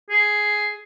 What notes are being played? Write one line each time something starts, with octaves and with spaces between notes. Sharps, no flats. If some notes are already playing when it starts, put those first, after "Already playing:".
G#4